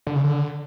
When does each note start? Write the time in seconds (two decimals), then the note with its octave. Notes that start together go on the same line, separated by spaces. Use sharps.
0.07 D3
0.15 C#3
0.24 D3